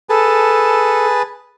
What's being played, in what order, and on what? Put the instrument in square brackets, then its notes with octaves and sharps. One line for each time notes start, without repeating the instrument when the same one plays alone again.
[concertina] G#4 B4 A5 [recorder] A4